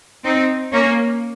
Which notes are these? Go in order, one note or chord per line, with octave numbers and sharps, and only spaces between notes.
C4 D#4
A#3 C#4